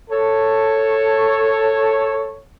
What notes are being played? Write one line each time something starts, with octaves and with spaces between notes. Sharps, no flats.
A4 C#5